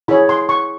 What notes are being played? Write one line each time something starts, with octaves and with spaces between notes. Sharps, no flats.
E4 G#4 C#5 B5
C6
C#6